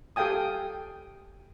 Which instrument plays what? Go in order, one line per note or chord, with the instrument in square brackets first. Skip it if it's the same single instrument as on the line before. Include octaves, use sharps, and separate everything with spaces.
[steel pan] G4 A4 F5 G5 G#5 D#6